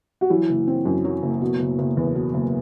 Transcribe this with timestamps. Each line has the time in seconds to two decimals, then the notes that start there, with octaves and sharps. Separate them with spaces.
0.21 F#4
0.30 E3 F#3 E4
0.49 F#1
0.67 C4
0.85 F#2
1.04 F#3
1.23 F#1
1.41 B2
1.60 F#1
1.79 F#1
1.97 E2
2.15 B2
2.34 F#1